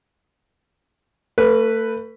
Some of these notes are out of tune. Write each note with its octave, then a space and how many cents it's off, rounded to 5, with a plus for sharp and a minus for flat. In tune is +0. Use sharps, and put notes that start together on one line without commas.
A3 +30 B4 +0